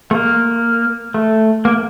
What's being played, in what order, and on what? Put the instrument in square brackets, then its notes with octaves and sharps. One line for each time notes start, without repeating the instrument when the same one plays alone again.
[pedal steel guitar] A3
A#3
A3
A#3